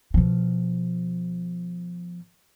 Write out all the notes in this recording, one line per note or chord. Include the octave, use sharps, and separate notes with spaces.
B2 F3